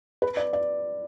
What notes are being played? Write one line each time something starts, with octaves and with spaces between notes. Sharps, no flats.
B4
D5
D5